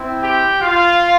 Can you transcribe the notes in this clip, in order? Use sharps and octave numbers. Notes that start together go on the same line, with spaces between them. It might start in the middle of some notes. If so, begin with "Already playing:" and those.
Already playing: C4 E4
G4 G5
F4 F5